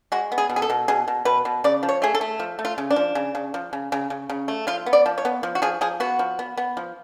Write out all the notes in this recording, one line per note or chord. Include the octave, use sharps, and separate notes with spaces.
G#3 F#4
B3
G#4
B2
G#4
A4
B2
B2 G#4
B2
B2 B4
B2
C#3 D5
F3
C#5
A3 G#4
A4
A3
F3
A3
F4
C#3
D4
F3
C#3
C#3
F3
C#3
C#3
C#3
C#3
A3
F3 F4
B3
D5
F3
C#5
B3
F3
F#4
F3 G#4
F3 G#4
B3 F#4
F3
B3
B3
F3